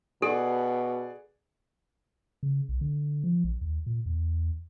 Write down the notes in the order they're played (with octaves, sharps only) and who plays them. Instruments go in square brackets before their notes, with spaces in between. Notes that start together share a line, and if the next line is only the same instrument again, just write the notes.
[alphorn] B2 [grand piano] G#4 D5 F#5 [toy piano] A4
[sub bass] C#3
B1
D3
F3
A#1
D#2
A#2
E2